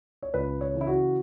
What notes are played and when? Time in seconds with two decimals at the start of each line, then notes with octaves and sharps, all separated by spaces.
0.22 C#5
0.34 C#2 B4
0.61 C#5
0.74 C#3 E3
0.81 E4
0.87 F#4